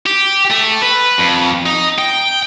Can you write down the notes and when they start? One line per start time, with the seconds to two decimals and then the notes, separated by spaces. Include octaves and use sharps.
0.06 G4
0.50 A3
0.82 B4
1.18 F2
1.66 D#4
1.99 G5